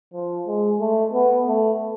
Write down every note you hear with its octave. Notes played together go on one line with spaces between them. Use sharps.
F3
G#3
A3
B3
A3